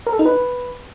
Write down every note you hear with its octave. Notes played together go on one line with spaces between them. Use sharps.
A#4
A4
D#4
B4